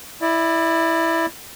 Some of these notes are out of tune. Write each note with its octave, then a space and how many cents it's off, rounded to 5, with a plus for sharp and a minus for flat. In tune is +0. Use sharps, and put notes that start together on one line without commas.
E4 +0 D5 +30